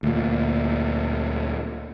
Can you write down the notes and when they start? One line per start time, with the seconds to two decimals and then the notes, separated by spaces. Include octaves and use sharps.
0.03 D2 A#2